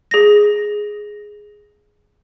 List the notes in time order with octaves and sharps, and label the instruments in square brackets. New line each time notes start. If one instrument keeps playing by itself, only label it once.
[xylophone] G#4 A#6